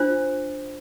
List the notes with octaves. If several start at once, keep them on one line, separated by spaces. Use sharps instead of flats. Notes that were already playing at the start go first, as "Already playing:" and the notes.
Already playing: D4 F4 C5